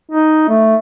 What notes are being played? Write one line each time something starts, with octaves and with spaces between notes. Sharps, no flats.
D#4
A3